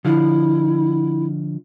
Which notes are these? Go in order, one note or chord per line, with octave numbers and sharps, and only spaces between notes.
D3 F3 E4